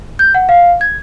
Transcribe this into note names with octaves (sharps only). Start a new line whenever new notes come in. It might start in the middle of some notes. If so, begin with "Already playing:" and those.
G6
F#5
F5
G#6